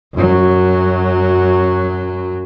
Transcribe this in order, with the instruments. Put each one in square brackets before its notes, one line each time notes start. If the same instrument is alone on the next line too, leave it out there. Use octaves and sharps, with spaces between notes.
[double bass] F#2 F#3